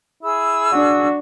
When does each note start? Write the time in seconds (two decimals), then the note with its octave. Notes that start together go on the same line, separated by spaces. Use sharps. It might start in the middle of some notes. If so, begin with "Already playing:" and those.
0.23 E4 G#4 E6
0.72 D4 F#4